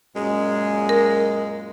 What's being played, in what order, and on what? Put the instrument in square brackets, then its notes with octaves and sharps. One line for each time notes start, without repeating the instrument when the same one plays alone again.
[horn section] F#2 A#2 G#3
[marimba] A#4